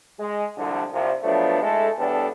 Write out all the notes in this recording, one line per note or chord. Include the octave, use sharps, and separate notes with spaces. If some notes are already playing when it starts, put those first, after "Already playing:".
G#3
C2 D3 F3
C2 C3 F3
F3 F#3 A3 B3 D4
G#3 A3 E4 A4
E2 A2 G3 B3 D4 A4